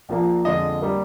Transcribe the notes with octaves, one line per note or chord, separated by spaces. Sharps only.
A#1 A#2 F3 A#3
F2 D3 G#3 D#5
G3 A#3